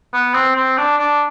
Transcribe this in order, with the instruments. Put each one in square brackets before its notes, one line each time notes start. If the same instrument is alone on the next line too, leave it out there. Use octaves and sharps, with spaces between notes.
[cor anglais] B3
C4
C4
D4
D4